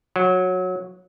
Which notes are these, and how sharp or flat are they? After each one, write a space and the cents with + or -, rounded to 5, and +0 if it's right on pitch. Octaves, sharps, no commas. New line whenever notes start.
F#3 -15